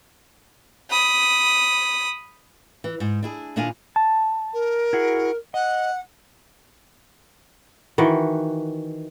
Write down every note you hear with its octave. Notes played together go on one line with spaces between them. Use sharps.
B5 D#6
E3
G#2
D4 E4 G#4
A#2 D#3 D4 E4 F5 G#5
A5
A#4
E4 F#4 G#4
D#5 F#5
D#3 E3 F#4